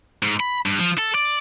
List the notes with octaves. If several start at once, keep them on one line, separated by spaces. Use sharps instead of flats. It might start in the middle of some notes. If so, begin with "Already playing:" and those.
G#2
B5
G2
F3
A4
D5